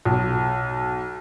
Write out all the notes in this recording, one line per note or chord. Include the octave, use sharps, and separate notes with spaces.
B1